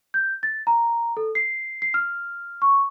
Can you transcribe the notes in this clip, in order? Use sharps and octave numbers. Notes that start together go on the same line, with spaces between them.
G6
A6
A#5
A4
C7
C7
F6
C#6